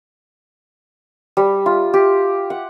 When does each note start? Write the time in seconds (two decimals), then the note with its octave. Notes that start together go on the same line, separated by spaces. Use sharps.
1.37 G3
1.66 F4
1.94 G4
2.50 F#5